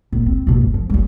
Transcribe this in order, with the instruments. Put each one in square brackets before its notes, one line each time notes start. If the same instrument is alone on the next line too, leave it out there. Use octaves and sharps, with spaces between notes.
[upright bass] A#1
C4
D#2 B2
G2
F3
G3 C#4